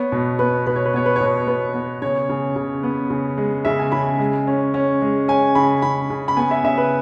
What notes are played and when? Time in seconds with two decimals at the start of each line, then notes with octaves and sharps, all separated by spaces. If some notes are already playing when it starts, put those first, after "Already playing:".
Already playing: B3 C#5
0.12 B2
0.39 B3 B4
0.67 B2 B4
0.76 C#5
0.86 B4
0.94 B3 C#5
1.06 B4
1.16 C#5
1.21 B2 B4
1.47 B3 B4
1.74 B3
2.02 C#3 C#5
2.29 C#3
2.56 C#3
2.83 B3
3.10 C#3
3.38 G#3
3.65 C#3 E5
3.79 G#5
3.92 C#3 B5
4.19 G#3
4.47 C#4
4.74 C#4
5.02 G#3
5.28 C#4 G#5
5.55 C#3 B5
5.82 C#3 B5
6.10 C#3
6.28 B5
6.37 B3 G#5
6.51 E5
6.64 C#3 E5
6.78 B4